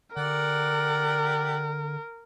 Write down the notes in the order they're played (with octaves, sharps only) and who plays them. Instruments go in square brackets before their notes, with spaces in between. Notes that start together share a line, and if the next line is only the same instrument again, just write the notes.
[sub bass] D3 [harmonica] G4 D5 F#5 [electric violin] A#4